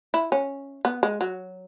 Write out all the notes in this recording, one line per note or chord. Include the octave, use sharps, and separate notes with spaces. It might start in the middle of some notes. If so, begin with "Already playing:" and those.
E4
C#4
B3
G#3
F#3